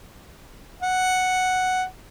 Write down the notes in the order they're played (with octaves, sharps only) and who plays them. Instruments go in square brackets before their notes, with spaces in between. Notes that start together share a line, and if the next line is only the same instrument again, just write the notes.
[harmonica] F#5